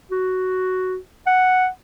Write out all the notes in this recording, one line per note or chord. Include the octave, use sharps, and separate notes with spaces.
F#4
F#5